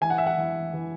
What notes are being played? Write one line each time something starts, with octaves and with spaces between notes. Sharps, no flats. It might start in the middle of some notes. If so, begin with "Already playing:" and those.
E3 G#5
F#5
E5
F#5
E3
E3